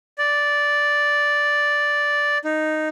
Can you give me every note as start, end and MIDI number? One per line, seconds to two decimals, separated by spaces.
0.18 2.38 74
2.44 2.89 63